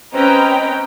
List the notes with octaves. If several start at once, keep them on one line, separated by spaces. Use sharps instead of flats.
C4 C#4 B4 D#5 G5 A#5